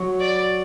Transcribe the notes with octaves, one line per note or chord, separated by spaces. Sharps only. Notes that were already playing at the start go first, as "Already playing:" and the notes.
Already playing: F#3
D5